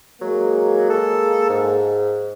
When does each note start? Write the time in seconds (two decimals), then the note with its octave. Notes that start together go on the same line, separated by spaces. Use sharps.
0.21 F#3 G#3 A#3 G#4
0.90 A4
1.49 G#2